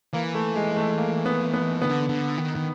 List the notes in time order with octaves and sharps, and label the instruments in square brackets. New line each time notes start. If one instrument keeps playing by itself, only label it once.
[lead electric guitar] E3 [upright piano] A#3
[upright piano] A3
G#3
A3
A#3
B3
B3
[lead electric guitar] D3 [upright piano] B3
[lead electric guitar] D3
D#3
D#3